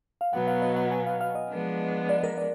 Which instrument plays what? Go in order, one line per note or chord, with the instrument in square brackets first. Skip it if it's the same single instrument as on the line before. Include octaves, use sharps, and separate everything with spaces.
[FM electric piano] F5
[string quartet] B2 F#3 B3 [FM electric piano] F#5
[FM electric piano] F5
D#5
F#5
G#5
F5
F5
D#5
[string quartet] F3 G#3 B3 D4
[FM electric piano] D5
A#4
D5